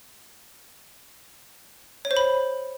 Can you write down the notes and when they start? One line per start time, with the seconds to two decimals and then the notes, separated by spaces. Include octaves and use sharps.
2.05 C#5
2.11 C5
2.17 B5